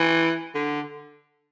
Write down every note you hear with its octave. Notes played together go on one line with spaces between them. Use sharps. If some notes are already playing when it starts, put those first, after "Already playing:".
Already playing: E3
D3